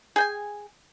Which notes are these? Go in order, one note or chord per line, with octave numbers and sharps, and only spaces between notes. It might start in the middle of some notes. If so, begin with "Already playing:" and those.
G#4 G5 G#5